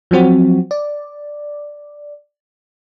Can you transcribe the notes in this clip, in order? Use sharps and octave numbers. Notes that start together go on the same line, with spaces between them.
F3 F#3 C4 F#4
D5